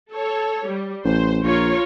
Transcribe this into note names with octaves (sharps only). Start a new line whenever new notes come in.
A4 C#5
G3
A1 C5
A#1 F4 A#4 C#5